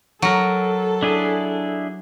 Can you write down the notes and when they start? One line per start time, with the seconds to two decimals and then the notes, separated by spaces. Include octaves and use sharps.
0.22 F#3 A4 A#4
1.02 D4 E4 G#4